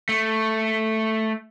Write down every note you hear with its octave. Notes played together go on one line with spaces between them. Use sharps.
A3